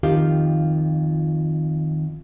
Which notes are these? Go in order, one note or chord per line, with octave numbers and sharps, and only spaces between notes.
F2 D#3 F4 G4 A#4 F5